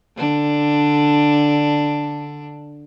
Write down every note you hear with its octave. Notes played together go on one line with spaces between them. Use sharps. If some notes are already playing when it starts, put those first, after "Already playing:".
D3 D4